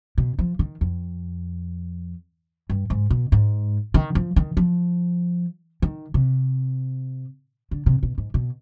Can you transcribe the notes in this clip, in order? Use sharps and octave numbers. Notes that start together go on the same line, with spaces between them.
B2
F3
D#3
F2
G2
G#2
B2
G#2
D#3
F3
D#3
F3
D#3
C3
D3
C3
B2
G#2
B2